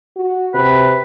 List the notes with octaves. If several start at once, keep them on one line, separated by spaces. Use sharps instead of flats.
F#4
C3 B4